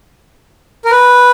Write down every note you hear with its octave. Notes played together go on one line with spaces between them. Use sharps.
A#4
B4